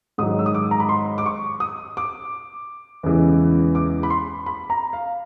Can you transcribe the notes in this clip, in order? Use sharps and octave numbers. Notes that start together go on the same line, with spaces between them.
G#2 D#3 F#3 D#6
E6
D#6
D6
A#5
B5
C6
D6
C#6
D#6
D6
E2 C#3 E3 G#3
D6
B5
C6
B5
A#5
F5